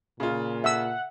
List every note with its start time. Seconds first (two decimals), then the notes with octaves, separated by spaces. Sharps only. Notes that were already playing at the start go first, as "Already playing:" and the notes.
0.20 A#2 C#3 F4
0.64 E5 F#5 E6